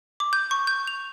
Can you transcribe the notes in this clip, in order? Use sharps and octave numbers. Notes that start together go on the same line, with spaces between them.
D6
G6
C#6
G6
F7